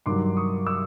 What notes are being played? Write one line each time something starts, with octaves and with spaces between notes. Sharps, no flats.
G2 D#3 F#3 C6 D6
C#6 D#6
D6 E6